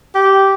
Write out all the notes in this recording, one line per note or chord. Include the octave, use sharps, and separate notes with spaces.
G4